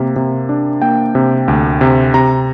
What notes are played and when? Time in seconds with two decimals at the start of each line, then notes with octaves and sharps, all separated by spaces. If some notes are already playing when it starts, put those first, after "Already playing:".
Already playing: C3 A#3
0.16 C3
0.49 D4
0.82 A#3 G5
1.15 C3
1.48 D2
1.81 C3
2.14 C3 A#5